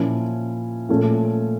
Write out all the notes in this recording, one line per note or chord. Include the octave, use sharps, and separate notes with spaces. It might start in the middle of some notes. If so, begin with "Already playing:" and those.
Already playing: A#2 F3 C#4 E4
A#2 F3 A3 C#4